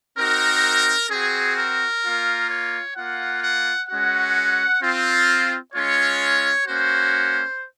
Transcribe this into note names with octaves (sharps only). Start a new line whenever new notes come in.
C4 D#4 F#4 A#4
C4 F#4 G#4
A#4
A#3 F4
C#5
A#3 F4 F#5
F#5
G#3 C#4 F#4 F#5
C4 F4
G#3 C#4 F4 C#5
A#3 C#4 F#4 C5